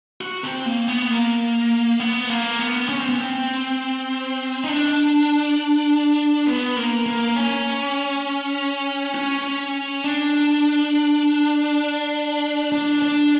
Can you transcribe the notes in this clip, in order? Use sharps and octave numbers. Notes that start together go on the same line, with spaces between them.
F#4
C4
A#3
B3
A#3
B3
A#3
B3
C#4
C4
B3
C4
D#4
D4
B3
A#3
A#3
C#4
C#4
D4
D4
D4